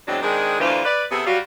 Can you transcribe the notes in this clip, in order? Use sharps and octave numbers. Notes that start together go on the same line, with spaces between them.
E2 F#3 G#3 C4 D4
D#3 G#3 C4 D4 G#4
D2 D3 E3 F4 B4 C5
B4 D5
C3 B3 G#4 A4 E5
G3 F4 F#4